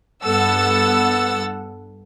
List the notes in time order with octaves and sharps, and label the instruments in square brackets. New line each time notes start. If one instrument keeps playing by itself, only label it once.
[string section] G2 B3 A4 F#5 E6 A6